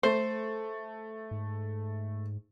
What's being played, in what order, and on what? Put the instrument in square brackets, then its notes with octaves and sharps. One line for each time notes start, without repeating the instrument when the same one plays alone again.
[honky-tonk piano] A3 [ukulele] C5
[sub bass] G#2